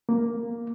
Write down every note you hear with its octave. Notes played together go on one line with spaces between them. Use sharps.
A#3